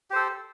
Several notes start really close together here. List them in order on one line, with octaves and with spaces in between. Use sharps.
G4 C5 A4